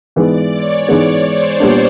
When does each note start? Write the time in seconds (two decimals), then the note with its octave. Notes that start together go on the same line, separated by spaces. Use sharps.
0.16 G#2 E3 G#3 B3 D5
0.52 C#5
0.88 G#2 E3 G#3 B3 C#5
1.24 C5
1.60 A#2 G3 B3 D4